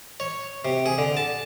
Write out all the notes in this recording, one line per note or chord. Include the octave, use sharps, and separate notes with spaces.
C#5
C3
G#4
D3
A5